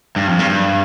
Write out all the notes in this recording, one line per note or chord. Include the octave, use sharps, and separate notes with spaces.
G2
F2
G2
G2